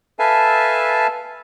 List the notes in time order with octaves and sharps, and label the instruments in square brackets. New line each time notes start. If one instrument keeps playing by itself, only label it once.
[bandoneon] A4 B4 E5 F5 G#5 A5